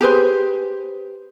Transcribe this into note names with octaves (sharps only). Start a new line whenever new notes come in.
G4 G#4 B4 C5